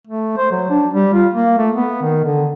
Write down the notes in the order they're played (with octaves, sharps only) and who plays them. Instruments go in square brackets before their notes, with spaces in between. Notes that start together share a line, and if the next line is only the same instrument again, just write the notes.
[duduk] A3
C5
F#3
D4
G3
F4
A#3
A3
B3
D#3
D3